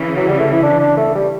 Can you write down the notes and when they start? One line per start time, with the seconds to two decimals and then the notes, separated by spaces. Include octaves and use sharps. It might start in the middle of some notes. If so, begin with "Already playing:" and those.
Already playing: C#3 E3
0.16 F#3
0.28 G3
0.39 A3
0.52 E4
0.63 D4
0.80 D4
0.97 A3
1.15 G3